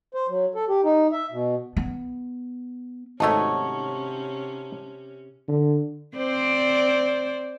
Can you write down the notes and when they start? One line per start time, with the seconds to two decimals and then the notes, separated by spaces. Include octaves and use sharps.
0.14 C5
0.28 F#3
0.55 A4
0.69 G4
0.84 D#4
1.12 E5
1.32 B2
1.77 B3
3.20 G#1 C3 A3 C#4 D#4 F#4 C#5 A5
5.48 D3
6.17 C4 C5 D5